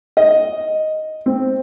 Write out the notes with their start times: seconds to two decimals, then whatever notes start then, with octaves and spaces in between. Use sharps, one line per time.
0.17 D#5
1.26 C4